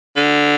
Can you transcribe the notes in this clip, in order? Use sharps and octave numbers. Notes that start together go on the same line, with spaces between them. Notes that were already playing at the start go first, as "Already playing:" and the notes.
D3